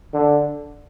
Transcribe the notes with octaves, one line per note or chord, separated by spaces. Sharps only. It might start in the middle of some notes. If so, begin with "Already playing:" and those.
D3